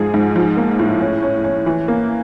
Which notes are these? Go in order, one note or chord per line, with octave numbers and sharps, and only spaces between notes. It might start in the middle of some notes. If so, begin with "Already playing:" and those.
Already playing: G#2 F3 G#4
G#2
F3
A#3
A2
C#4
C#4
C#4
E3
A#3